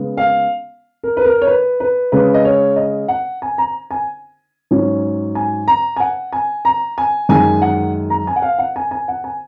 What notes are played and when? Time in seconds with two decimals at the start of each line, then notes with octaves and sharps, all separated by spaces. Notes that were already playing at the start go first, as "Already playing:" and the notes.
Already playing: C#3 G#3 B3
0.17 F5
1.04 A#4
1.17 B4
1.25 A#4
1.42 C#5
1.47 B4
1.80 B4
2.12 C#3 G#3 C#4 B4
2.34 D#5
2.45 C#5
2.76 D#5
3.08 F#5
3.42 G#5
3.58 A#5
3.91 G#5
4.71 G#2 F#3 C#4
5.35 G#5
5.68 A#5
5.96 G#5
6.00 F#5
6.33 G#5
6.65 A#5
6.98 G#5
7.29 F#2 D#3 G#3 G#5
7.62 F#5
8.10 A#5
8.27 G#5
8.36 F#5
8.42 F5
8.58 F#5
8.76 G#5
8.91 G#5
9.08 F#5
9.24 G#5